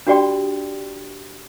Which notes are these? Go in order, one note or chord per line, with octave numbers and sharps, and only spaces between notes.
D4 F#4 G4 D5 G5 C6